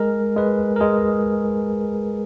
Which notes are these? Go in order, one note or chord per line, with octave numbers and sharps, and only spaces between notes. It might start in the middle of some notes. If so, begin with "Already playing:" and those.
Already playing: G#3 A#4
G#3 B4
A#4
G#3 G#4